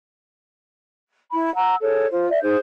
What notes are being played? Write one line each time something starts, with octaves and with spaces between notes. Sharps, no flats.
E4 B5
F#5 A#5 E6
G#4 A4 C#5
F4 C5
D5 E5
D#4 G#4 C5 G6